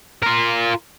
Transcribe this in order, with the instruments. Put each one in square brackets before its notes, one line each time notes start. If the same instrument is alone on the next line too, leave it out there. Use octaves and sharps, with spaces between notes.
[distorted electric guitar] F4 A#4